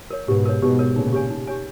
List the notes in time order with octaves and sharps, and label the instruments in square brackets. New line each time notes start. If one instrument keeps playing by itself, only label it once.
[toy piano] A#4 C#5
[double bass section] G#2 B2 [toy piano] G4
[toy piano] A#4 C#5
[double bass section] G#2 B2 [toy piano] G4
[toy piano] A#4 C#5
[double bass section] A#2 C#3 [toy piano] D#4
[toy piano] G4 C#5 G#5
D#4
G4 C#5 G#5